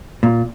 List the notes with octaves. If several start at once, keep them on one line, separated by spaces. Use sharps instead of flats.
A#2